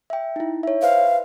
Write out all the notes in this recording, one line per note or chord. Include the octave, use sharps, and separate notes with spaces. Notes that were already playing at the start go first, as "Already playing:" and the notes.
E5 G5
D#4 E4
C#5 E5
B4 C5 E5 F5